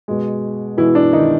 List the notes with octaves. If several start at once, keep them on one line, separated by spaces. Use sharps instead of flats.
B2 G#3
B2 E3 G#3 E4
D4
D#3 D#4